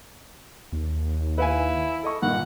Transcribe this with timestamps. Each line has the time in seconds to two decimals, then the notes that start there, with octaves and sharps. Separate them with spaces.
0.72 D#2
1.38 E4 B4 F5 G#5
2.03 A4 D#5 C#6
2.22 G2 A#2 D#3 F#5